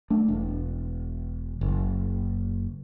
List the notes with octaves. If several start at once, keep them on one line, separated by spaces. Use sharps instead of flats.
A3 D4
E1
F#1